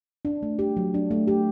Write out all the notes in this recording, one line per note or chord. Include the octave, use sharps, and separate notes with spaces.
D4
A3
G4
F#3
D4
A3
G4